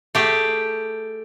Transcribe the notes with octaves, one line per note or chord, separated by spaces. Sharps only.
A3 G4 G#4